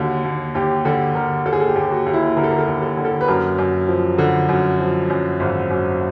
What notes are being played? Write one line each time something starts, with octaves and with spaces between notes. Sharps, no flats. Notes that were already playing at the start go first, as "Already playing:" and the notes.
Already playing: D#2 D3 F#4
D#2
D#2 G4
D3 A4
D3 A#4
D#2 A4
G#4
A4
G4
D#2
F#4
D#2
E4
D3 A#4
A4
A#4
A4
D#2
A4
D3
A4
B4
F#2 A#4
F#2
F3
D3 A4
F#2
F3
F#2
G#1
F#2